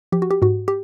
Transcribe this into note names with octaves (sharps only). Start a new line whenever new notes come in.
F3 G4
F#4
G4
G#2 F#4
G4